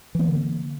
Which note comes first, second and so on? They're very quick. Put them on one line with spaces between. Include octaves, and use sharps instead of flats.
E3 B3 A#3 D3